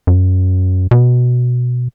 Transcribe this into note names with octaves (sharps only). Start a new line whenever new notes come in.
F#2
B2